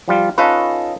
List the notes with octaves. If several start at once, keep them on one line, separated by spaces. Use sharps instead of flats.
F3 G3 F4
C#4 D#4 F4 A4 B4